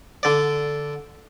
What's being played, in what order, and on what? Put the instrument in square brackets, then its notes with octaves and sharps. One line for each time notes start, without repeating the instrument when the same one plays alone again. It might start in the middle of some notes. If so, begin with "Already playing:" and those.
[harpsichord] D3 D5